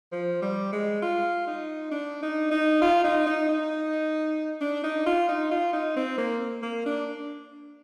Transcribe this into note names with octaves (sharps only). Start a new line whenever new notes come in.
F3
G3
G#3
F4
D#4
D4
D#4
D#4
F4
D#4
D#4
D#4
D4
D#4
F4
D#4
F4
D#4
C4
A#3
A#3
D4